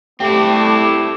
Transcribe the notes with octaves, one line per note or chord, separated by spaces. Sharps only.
A3 B3 C4 D4 E4 G4 D6